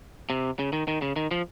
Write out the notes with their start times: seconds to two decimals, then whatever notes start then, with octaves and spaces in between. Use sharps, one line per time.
0.30 C3
0.59 C#3
0.73 D#3
0.88 D#3
1.02 C#3
1.16 D#3
1.31 F3